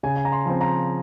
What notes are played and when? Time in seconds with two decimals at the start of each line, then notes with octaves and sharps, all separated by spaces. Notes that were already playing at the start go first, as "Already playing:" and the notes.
0.03 C#3 G#5
0.16 G#5
0.25 A#5
0.32 C6
0.46 F3 C4
0.61 A#5